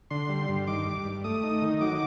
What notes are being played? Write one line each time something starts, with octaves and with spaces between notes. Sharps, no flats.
D3 C6
G3
G2
D#3 D6
G3
G2
A3 D#6
D#4
D#3
F#3 D6